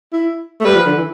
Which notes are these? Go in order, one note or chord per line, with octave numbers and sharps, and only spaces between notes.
E4
A3
G3 B4
F3
D3
E3